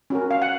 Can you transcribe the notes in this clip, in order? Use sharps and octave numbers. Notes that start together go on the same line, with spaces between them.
C#4 F#4 A#4
F5
F#5